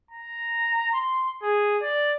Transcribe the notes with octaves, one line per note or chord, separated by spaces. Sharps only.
A#5
C6
G#4
D5